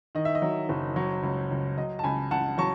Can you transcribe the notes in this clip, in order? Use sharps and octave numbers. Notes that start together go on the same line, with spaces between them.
D#3 D#5
E5
D#5
F#3
F#1
F#3 C#5
C#2
C#2
F#3 D#5
A5
C#2 G#5 B5
C#2 F#5 A5
F#3 A5 C#6